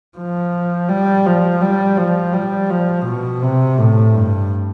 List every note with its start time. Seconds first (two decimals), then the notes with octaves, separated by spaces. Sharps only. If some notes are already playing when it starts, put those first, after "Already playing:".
0.17 F3
0.89 G3
1.26 F3
1.61 G3
1.98 F3
2.33 G3
2.70 F3
3.06 B2
3.42 C3
3.78 A2
4.14 G2